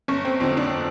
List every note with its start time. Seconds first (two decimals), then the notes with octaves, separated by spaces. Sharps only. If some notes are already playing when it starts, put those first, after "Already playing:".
0.08 G1 C#4
0.25 C4
0.40 F2 D3 C4
0.57 D4